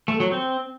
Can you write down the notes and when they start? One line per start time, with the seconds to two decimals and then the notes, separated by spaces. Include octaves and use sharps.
0.08 A3
0.20 F#3
0.32 C4